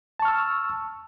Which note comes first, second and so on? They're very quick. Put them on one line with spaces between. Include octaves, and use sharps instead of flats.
A5 C#6 F6 E6